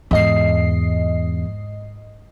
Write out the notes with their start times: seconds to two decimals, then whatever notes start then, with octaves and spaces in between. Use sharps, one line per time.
0.11 E2 G#2 D#5 C7